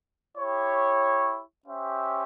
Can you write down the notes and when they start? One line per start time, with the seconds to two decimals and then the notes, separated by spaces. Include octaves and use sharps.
0.36 E4 G4 C#5
1.65 C#4 G4 C5 E5